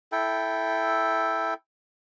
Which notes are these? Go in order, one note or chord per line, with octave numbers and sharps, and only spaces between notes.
E4 A4 G5